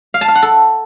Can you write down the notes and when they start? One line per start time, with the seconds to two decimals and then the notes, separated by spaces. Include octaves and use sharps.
0.14 F5
0.21 A5
0.28 F5
0.35 F#5
0.42 A4